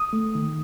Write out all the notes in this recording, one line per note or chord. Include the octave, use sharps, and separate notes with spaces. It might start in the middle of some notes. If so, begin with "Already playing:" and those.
Already playing: D#6
A3
D#3